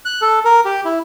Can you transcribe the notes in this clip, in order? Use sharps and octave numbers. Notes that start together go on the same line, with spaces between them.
F#6
A4
A#4
G4
E4